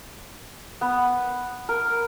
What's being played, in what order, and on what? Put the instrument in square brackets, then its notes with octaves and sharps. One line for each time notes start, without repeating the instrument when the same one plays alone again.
[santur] B3
A#4